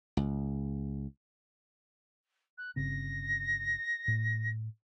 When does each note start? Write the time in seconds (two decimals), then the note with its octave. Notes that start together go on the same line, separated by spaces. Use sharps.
0.17 C#2
2.58 F#6
2.76 G1 C#3 C4 A#6
4.08 A2